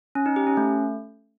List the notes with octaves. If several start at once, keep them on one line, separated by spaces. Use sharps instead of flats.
C#4
D#4
G4
C#4
A3